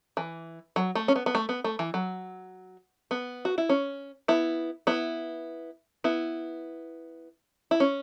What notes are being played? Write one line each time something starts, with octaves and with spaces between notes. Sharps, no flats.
E3
F#3
A3
C#4
B3
B3
A3
B3
A3
E3
F#3
B3
F#4
E4
C#4
B3 E4
B3 E4
B3 E4
E4
C#4